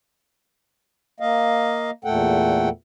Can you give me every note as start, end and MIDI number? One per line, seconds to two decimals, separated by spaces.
1.20 1.91 58
1.20 1.91 75
1.20 1.91 77
2.04 2.69 40
2.04 2.69 46
2.04 2.69 57
2.04 2.69 69
2.04 2.69 78
2.04 2.69 79